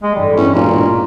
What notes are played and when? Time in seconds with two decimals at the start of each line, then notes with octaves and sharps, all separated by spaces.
0.03 G#3
0.16 A1 G2 G3
0.37 E2 C#4 E4
0.54 E1 A#2